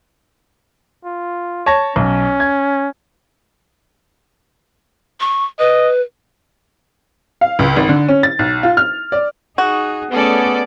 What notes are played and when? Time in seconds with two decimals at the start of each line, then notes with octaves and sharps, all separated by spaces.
1.05 F4
1.66 C#5 A5 A#6
1.96 B1 C#4
2.40 G#6
5.20 C#6
5.59 B4 D#5
7.41 F5
7.59 C#2
7.76 G#1
7.89 D3
8.08 C#4
8.23 A6
8.39 B1
8.63 F4
8.77 F6
9.12 D5
9.58 D#4 F#4 G#4
10.12 A3 B3 C#4 G#4 A4 D5